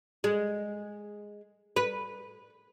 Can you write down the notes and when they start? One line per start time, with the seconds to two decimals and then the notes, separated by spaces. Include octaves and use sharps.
0.24 G#3
1.76 B4